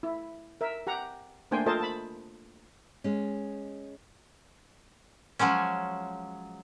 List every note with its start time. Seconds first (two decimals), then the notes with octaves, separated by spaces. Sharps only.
0.03 E4
0.61 A#4 E5
0.87 G4 F#5 A#5
1.51 A3 A#3 D4 C5 G5 G#5
1.66 F4 A4 A#4 C5 D#5 A5
1.80 A5 B5
3.04 G#3 C#4
5.39 F3 F#3 G#3 C#4